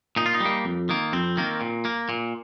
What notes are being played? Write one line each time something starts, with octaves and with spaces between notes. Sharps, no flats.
A#2 D#4
F4
D#4
G3 A#3
F2
D#3 A#3
F2 C4
D#3 A#3
A#2
A#3
A#2